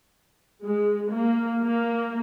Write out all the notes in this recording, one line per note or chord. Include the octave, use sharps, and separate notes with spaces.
G#3
A#3
A#3